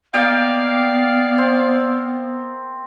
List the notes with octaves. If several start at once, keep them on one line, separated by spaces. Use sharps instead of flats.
A#3 B3 D5 D#5 F5 G5
C4